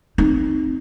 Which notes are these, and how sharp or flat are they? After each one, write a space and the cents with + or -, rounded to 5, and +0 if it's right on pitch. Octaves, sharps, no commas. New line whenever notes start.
C4 +0 D#4 -10